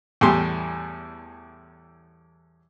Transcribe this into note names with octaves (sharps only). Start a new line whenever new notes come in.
E2 A2 G3 G4 C6